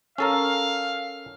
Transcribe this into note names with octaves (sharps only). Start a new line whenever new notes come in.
C#4 A4 A#4 F5